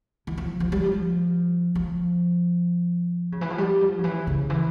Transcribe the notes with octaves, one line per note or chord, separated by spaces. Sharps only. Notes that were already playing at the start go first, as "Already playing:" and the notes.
E3
F3
F3
G3
F3
F3
C#3
E3
F3
G3
F3
C#3
E3
C#3
E3